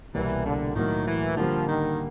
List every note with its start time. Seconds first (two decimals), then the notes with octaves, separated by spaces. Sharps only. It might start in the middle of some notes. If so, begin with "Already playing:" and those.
0.14 C2 B2 E3 G3 A#3
0.45 D3
0.75 A2 D#3 F#3 A#3
1.06 E3
1.37 D3 F3 G3 A#3
1.67 D#3